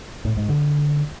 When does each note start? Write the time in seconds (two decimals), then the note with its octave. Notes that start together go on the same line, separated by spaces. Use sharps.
0.25 A2
0.37 G#2
0.49 D3